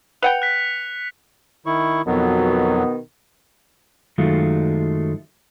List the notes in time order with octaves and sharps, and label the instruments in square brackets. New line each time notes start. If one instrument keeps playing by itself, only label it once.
[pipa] B4 F#5 G5 [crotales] C#7 F7
[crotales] F#6 B6
[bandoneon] D#3 E4 C#6
[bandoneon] F2 F#3 [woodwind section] B2 D#3 B3
[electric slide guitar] F#2 D#3 F#3 G#3 A3 F4